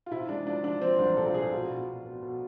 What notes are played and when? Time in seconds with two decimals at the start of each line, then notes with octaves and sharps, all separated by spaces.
0.06 F4
0.11 C3 E4
0.29 G#3 D4
0.47 F3 D4
0.64 F3 D4
0.82 F3 C4
0.99 C2 D4
1.17 C3 A4
1.26 F4
1.34 C3 G#4
1.52 B2 F4
1.70 B2
1.88 B2
2.04 B2
2.22 B2